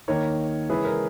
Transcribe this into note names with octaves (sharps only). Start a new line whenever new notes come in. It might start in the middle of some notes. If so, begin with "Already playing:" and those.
D#2 D#3 A#3 D#4 A#4 C#5
C#3 E3 G#3 C#4 E4 G#4 B4
A#4